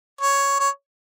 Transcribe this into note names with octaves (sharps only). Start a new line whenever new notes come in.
C#5
C#5